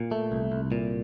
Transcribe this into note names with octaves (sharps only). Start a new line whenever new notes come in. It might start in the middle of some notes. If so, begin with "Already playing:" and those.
Already playing: A#2
A3
C2
C2
A#2